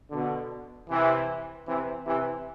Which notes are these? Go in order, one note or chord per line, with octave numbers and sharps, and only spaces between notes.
B2 D3
C3 E3
C3 E3
C3 E3